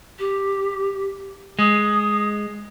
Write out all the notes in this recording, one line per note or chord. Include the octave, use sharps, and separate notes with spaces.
G4
G#3 D#6